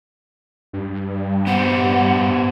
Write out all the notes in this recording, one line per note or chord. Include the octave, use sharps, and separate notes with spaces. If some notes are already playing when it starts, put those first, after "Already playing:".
G2
B3 G4 C5 F#5